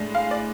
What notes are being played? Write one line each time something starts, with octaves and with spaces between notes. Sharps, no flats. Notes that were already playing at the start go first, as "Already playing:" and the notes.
Already playing: A2 G#3 D4
F5
D5